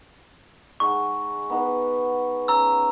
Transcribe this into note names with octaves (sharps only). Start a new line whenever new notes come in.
G#3 D#4 F#5 C#6
B3 D#4 B4
C#4 A#5 E6